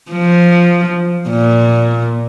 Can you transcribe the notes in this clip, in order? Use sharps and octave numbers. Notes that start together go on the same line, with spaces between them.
F3
A#2